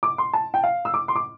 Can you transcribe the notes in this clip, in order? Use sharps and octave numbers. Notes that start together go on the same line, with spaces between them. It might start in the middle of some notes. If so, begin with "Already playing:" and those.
D6
C6
A5
G5
F5
E6
D6
C6
D6